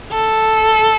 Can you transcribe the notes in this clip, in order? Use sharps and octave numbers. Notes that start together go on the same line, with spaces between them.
A4